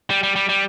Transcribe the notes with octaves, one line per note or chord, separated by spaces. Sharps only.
G3
G3
G3
G3